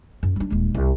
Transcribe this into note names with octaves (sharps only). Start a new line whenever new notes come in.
F#2
G3 D4
D#1 G#3
C2